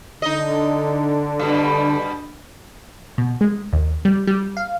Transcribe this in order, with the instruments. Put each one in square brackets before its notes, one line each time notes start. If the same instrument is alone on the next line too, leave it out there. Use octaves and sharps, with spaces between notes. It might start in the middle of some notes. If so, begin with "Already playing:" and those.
[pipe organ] D3 [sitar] D#4 D#5
[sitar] G2 B2 G3
[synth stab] B2
G#3
D#2
G3
G3
F5